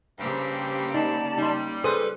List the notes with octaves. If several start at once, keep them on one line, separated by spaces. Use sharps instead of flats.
G2 C#3 A#3 C4 G4
D#4 D5 A5
G3 D#4 C6
G#4 A4 B4 C5 D#6